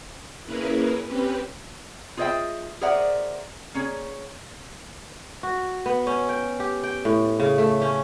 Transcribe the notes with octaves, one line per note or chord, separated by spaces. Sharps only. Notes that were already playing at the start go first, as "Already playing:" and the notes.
A#3 C#4 E4 G#4 A#4 B4
C4 C#4 G4 B4
F4 G#4 C5 D#5 E5 G5
G#4 A#4 C5 D5 E5 F#5
A#3 C#4 G#4 C#5
F#4
B3
C#4
G5
G4
G5
A2
C#3
A3
C#4